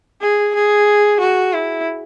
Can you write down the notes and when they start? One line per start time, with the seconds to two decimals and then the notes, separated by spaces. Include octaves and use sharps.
0.21 G#4
0.55 G#4
1.21 F#4
1.53 E4